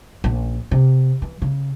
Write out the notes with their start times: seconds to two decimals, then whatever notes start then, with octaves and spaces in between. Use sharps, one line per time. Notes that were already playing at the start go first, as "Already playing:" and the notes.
0.24 A#1 C#4
0.71 C3
1.22 E3
1.42 C#3